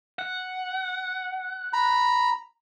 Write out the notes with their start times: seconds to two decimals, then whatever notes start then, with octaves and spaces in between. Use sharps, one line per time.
0.19 F#5
1.73 A#5 B5